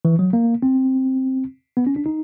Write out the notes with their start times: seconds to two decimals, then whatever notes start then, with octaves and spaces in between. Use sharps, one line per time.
0.05 E3
0.19 F#3
0.33 A#3
0.62 C4
1.77 B3
1.87 C#4
1.96 D4
2.06 D#4